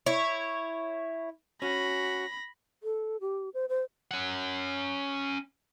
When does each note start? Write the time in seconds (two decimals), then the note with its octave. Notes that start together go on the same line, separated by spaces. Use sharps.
0.06 E4 C#5
1.62 C#4 F#4 B5 A#6
2.83 A4
3.21 G4
3.54 C5
3.69 C5
4.11 C#4 F#5